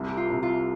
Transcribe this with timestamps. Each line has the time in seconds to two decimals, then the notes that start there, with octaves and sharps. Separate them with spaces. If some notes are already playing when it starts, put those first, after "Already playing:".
Already playing: C2 C3 D4
0.08 G4
0.17 F4
0.30 C3
0.43 F4